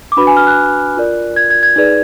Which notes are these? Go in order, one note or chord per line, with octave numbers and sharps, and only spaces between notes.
D6
D4 F#4 B4 B5
G#5
F6
F#6
F4 A#4 D5
G#6
G#6
G#6
D#4 G#4 B4 D5